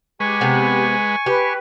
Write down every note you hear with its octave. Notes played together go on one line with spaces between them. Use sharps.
G#3 G4 B4 G#5 C#6
C3 B3
G4 B4